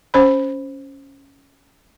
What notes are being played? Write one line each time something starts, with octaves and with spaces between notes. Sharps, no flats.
C#4 C5 B5